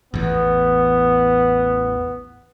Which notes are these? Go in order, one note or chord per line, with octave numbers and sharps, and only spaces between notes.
A1 E2 B3